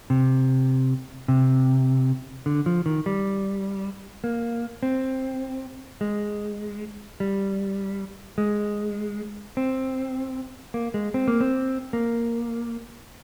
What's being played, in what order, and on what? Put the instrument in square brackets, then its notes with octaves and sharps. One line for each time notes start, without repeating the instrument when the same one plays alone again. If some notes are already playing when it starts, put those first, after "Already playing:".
[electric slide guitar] C3
C3
D3
F3
D#3
G3
A#3
C4
G#3
G3
G#3
C4
A#3
G#3
C4
A#3
C4
A#3